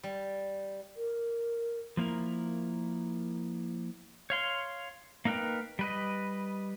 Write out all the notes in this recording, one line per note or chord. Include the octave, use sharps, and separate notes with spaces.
G3
A#4
F3 A#3 E4 A#4
C#5 F5 C6
A#3 D#4 A#4 B4 G5
G3 B4 D#5